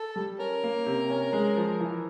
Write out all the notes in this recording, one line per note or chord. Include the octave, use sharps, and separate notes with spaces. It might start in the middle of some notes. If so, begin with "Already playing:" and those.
Already playing: A4
G3
C#4 A#4
A#3
C3
C#4
G#3
F3
E3